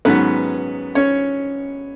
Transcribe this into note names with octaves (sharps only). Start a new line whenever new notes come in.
G#2 D#3 F#3 B3 C#4 B4
C#4 C#5